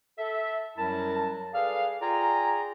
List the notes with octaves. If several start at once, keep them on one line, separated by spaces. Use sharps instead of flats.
A4 E5
F#2 F#3 G3 E4 A#4 A5
G#4 A4 B4 D5 F5
F4 G#4 D5 G5 G#5 A#5